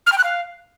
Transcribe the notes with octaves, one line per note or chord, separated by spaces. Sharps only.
F6
G5
F#6
F5